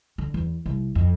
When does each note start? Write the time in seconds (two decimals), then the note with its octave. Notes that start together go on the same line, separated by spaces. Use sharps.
0.18 D3
0.34 E2
0.66 C2
0.95 F2